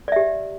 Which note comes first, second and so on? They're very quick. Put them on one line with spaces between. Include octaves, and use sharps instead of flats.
D5 E5 G4